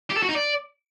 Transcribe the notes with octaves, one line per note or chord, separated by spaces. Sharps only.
G4
A4
F#4
D#4
D5